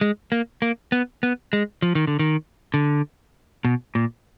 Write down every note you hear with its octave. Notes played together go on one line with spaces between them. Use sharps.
G#3
A#3
A#3
B3
B3
G#3
F3
D#3
D3
D#3
D3
B2
A#2